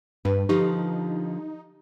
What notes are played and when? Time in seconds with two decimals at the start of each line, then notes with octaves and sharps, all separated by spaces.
0.25 G2 B4
0.49 D3 F3 D#4 F4 G4